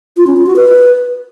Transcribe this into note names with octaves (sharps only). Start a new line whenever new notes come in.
F4
C#4
F4
F#4
B4